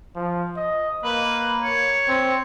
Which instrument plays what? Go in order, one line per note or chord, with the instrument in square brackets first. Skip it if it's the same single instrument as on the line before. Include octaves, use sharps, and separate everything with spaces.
[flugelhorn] F3
D#5
[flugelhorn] A#3 [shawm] B4
[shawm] C#5
[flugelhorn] C4